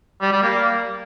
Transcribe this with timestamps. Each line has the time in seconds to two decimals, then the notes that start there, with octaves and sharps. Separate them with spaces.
0.22 G3
0.32 G3
0.42 A#3